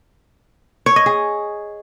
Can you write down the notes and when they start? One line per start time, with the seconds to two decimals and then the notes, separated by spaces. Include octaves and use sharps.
0.86 C#5
0.96 D#5
1.06 G#4